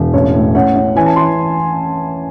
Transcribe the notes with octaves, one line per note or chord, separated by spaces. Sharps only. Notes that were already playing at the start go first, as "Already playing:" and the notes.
Already playing: E1
A1 C#5
A2
C#4 F#5
C#4
E3 G#5
A5
E3 C6